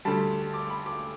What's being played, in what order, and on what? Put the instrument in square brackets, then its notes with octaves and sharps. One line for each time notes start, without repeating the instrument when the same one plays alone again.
[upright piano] D2 D3 G3 A5
D6
B5
D6